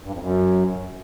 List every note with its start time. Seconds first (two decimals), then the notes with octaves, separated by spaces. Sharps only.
0.04 G2
0.13 F2
0.22 F#2